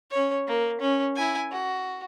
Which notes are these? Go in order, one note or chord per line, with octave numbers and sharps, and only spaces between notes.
C#4 C#5
A#3
C#4
E4 G#5
F#4